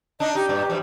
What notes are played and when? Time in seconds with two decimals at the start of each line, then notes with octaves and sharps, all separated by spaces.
0.20 D4 D#4 D#5
0.35 D#4 G4
0.49 G2 A#2
0.70 E3 F3 G3